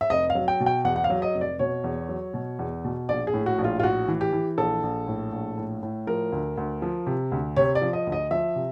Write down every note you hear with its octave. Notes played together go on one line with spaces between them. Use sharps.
E5
F1 D#5
F5
F#3
G5
B2
G5
E2 F#5
F#5
F5
F#3
D#5
F1
D5
B2 C#5
E2
F#3
B2
E2
B2
A#1 D5
G#4
A2
F#4
A#1
F4
F4
A2 F#4
E3
G4
E3
A#1 A4
A#1
A2
A#1
A2
A2
F3 A#4
D2
D2
F3
C3
D2
C3 C#5
D5
F3
D#5
D2
D#5
F3 E5
C3